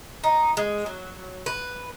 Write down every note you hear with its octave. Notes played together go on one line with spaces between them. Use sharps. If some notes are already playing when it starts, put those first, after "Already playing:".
D#4
G#3
F#3
B4